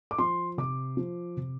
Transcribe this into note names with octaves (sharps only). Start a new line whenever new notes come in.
D6
F3 C6
C3 D6
F3
C3